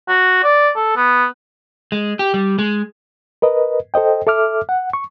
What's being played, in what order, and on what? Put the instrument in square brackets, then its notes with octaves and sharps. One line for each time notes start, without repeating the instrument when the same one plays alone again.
[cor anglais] F#4
D5
A4
B3
[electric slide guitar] G#3
G4
G3
G#3
[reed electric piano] A#4 B4 D#5
A4 C5 D#5 G5
A4 E5 D6 F6
F#5
C#6